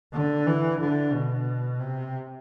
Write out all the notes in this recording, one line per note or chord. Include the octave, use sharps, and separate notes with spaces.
D3
E3
D3
B2
C3